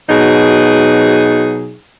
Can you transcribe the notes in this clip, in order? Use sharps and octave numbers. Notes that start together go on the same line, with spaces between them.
B2 F#3 D#4 G#4